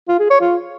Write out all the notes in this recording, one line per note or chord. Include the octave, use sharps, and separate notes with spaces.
F4
G#4
C#5
F4